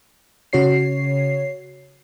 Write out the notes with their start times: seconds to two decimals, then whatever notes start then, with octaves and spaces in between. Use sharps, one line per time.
0.53 C#3 F#4 C#5 C7